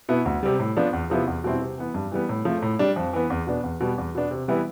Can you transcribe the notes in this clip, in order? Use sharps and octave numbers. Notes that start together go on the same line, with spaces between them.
B2 B3 E4
D2
C3 G3
A2
F3 B3 D4
E2
C3 F3 B3 E4
E2
B2 G3 C4 E4
C3
E3 B3
G2
E3 G3 B3
A2
F3 A3
A2
G3 D4
F2
E3 B3
E2
B2 B3 D4
E2
B2 G3 B3
E2
B2 B3 D4
C3
E3 G3 B3 E4